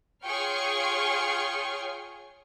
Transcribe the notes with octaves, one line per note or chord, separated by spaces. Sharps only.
F4 G#4 C#5 G5 C#6 F6